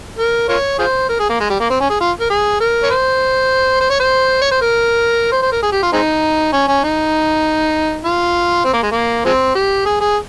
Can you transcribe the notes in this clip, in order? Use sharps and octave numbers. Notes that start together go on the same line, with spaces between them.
A#4
F4 A#4 C#5
F4 G#4 C5
A#4
G#4
A#3
G#3
G3
A#3
C4
C#4
G#4
F4
A#4
G#4
A#4
C#5
C5
C5
C#5
C5
C#5
C5
A#4
C5
C5
A#4
G#4
G4
F4
G#3 C4 D#4
C#4
C#4
D#4
F4
C4
A#3
G#3
A#3
F3 G#3 C4
G4
G#4
G#4